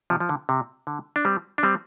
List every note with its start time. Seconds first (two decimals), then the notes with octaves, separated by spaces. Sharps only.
0.10 C3 F3
0.20 F3
0.29 D3
0.49 C3
0.87 D3
1.16 D4
1.25 G3 C4
1.58 D4
1.63 G3 C4